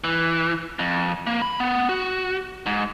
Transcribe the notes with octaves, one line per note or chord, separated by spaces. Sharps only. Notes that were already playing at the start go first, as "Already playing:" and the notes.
E3
F2
A#3
B5
B3
F#4
G#2